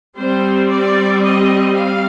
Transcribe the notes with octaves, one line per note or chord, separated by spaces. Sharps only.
G3 C4 C5
D5
D#5
F5